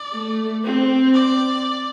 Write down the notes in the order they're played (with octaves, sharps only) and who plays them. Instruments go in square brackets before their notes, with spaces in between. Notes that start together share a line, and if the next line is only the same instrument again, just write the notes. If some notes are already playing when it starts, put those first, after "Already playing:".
Already playing: [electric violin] D5
[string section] A3
C4
[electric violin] D5